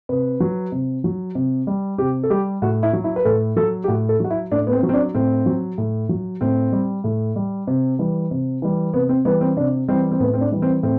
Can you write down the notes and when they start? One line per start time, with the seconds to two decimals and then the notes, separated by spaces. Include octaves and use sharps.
0.09 C3 B4
0.40 F#3
0.72 C3
1.04 F#3
1.35 C3
1.67 G3
1.98 C3 G4
2.23 A4
2.30 G3 G4
2.62 A2 F#4
2.83 E4
2.93 F#3
3.04 E4
3.16 B4
3.25 A2 A4
3.56 F#3 A4
3.84 G4
3.88 A2 F#4
4.09 A4
4.20 F#3 F#4
4.30 E4
4.51 A2 D4
4.67 B3
4.72 C4
4.83 F#3
4.89 C4
4.94 D4
5.15 A2 C4
5.46 F#3
5.78 A2
6.09 F#3
6.41 A2 C4
6.72 G3
7.04 A2
7.36 G3
7.67 C3
7.99 E3 G3
8.31 C3
8.62 E3 G3
8.94 C3 B3
9.09 C4
9.25 E3 G3 B3
9.41 C4
9.57 C3 D4
9.88 E3 G3 C4
10.12 C4
10.20 A2 B3
10.34 C4
10.41 D4
10.52 E3 G3
10.62 C4
10.83 A2 C4